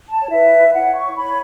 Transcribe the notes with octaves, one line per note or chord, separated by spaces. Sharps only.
A5
C#5
E4 B4 E5
E4 C#5 F#5
C#6
E4 C#5 B5